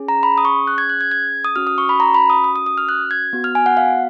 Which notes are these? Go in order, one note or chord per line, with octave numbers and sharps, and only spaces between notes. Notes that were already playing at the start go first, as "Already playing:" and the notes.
Already playing: C#4 G#4
A#5
B5
D#6
C#6
F#6
G#6
F#6
G#6
G#6
D#6
C#4 F#4 F6
D#6
C#6
B5
A#5
B5
D#6
D#6
D#6
D#6
F6
F#6
G#6
B3 F#4
F6
G#5
F#5
F5